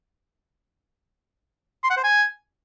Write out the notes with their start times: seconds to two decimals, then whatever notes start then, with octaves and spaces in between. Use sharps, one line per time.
1.84 C6
1.90 F#5
1.97 C5
2.04 G#5